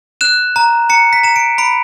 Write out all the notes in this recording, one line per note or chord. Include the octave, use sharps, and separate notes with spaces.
F#6 E7
A#5
A#5 C#7
B6
A#5 E7
D7
B5 D7